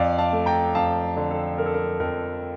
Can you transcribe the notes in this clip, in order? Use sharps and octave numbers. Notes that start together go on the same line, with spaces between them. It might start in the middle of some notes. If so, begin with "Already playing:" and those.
Already playing: F2 D5 F5
F5 A5
A3
G5 A#5
F2 F5 A5
D3
A4
D3 A#4
A4
A#4
F2 A#4